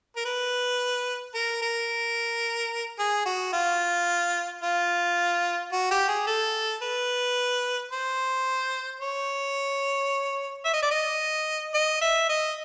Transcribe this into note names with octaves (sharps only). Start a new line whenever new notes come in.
A#4
B4
A#4
A#4
G#4
F#4
F4
F4
F#4
G4
G#4
A4
B4
C5
C#5
E5
D#5
D5
D#5
D#5
E5
D#5